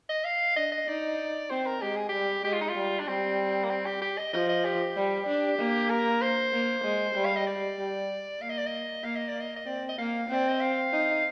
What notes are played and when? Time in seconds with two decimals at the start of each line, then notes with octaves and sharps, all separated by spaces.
0.09 D#5
0.25 F5
0.56 D4 D#5
0.72 D#5
0.88 D#4 D5
1.50 C4 C5
1.66 A#4
1.82 G#3 G4
1.96 G#4
2.09 G3 G4
2.44 G#3 G4
2.53 F4
2.61 D#4
2.69 F4
2.76 G3
2.99 D4
3.07 G3 C4
3.64 A#3
3.70 C4
3.86 G4
4.02 G4
4.18 D#5
4.33 F3 D#5
4.49 D#5
4.65 G4
4.96 G3
5.27 D4
5.59 A#3
5.90 A#4
6.21 C5
6.53 A#3
6.84 G#3
7.15 G3
7.25 F5
7.36 D#5
7.47 D5
7.78 G3
8.42 A#3 F5
8.50 D#5
8.58 D5
8.66 D#5
9.04 A#3 F5
9.16 D#5
9.28 D5
9.40 D#5
9.56 D#5
9.66 C4 D5
9.89 D#5
9.98 A#3 F5
10.29 C4 D5
10.48 D#5
10.61 F5
10.93 D#4